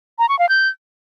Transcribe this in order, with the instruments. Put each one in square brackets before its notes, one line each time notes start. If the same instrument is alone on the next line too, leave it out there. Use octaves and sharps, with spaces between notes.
[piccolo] A#5
C#6
F5
G6